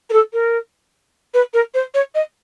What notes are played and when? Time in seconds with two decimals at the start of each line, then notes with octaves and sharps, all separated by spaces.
0.10 A#4
0.13 A4
0.33 A#4
1.34 B4
1.53 A#4
1.74 C5
1.94 C#5
2.15 D#5